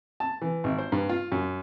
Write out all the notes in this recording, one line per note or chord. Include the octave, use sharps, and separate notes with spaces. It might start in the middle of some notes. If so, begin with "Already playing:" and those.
A5
E3
G#1
C5
G2
F4
F#2